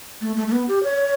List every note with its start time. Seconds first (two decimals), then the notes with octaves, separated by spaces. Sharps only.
0.21 A3
0.36 A3
0.48 A3
0.52 B3
0.68 G4
0.83 C#5